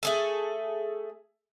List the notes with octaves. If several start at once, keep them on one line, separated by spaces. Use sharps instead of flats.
A3 G#4 A4